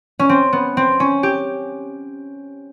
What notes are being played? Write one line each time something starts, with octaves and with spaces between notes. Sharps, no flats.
C#4
C4
B3
C4
C#4
G4